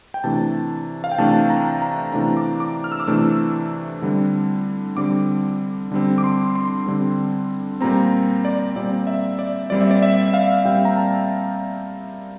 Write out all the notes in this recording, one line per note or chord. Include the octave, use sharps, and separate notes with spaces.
G5
C3 E3 A3 D4 A5
F5
G5
C3 E3 A3 D4 A5
A#5
A#5
C3 E3 A3 D4 A#5
D6
D6
F6
E6
D6
C3 E3 A3 D4 E6
D3 G3 C4
D3 G3 C4 D6
D3 G3 C4
D6
C6
C6
D3 G3 C4
A#2 G3 C4 A#5
D5
A#2 G3 C4 D5
E5
D5
A#2 G3 C4 D5
E5
D5
E5
E5
F5
A#2 G3 C4 G5
A#5
A5